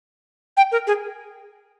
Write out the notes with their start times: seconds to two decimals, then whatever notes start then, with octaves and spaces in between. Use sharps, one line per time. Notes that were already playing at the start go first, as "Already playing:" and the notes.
0.57 G5
0.72 A#4
0.87 G#4